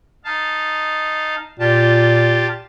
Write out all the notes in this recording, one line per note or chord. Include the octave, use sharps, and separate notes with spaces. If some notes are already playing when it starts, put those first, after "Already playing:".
D#4 F5 A5
A#2 F4 G4 A5